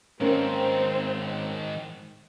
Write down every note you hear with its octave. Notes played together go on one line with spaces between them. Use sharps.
G#2 D#3 A#3 C4 C#4